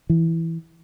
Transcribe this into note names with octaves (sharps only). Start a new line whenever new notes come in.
E3